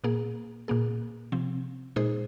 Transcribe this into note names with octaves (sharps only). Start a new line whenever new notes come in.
A#2 A#3 G#4
A#2 A#3 G#4
C3 F3 C4
A#2 G#3 D#4 G#4 C5